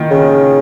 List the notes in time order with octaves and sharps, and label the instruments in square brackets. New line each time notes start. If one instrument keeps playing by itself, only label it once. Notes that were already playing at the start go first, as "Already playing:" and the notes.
Already playing: [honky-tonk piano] A#2 D#3
[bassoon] C#3